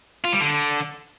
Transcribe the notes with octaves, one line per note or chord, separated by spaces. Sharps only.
F4
G3
D3